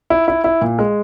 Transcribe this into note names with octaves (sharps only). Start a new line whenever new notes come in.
E4
E4
E4
A#2
G#3